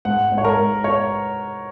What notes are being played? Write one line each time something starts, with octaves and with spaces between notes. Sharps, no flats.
G#2 F#5
G#2
C#5
A#4
G#2
C#5